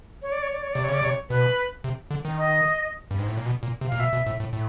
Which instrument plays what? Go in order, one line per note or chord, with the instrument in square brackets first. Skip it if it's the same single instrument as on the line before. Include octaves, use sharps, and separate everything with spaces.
[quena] C#5
D5
C#5
D5
C#5
[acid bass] C3 [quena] D5
[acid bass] C#3 [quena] C#5
[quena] D5
[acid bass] C3 [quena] C#5
[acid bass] B2 [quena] B4
[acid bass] C3
D3
D#3
[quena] D#5
[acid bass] G2
G#2
A2
A#2
B2
A#2
C3
[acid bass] A#2 [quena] F5
[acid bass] B2 [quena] E5
[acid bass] B2
A2
A2
A2